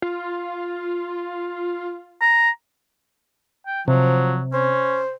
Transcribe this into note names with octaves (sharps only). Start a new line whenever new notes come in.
F4
A#5
G5
C3 F3 F#3
C#4 C5